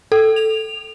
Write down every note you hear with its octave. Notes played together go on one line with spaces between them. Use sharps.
A4
F7